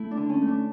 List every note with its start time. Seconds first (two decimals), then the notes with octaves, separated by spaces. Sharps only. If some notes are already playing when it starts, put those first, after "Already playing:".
Already playing: A3 E4
0.11 D4
0.17 D3
0.29 C#4
0.42 A3
0.48 D4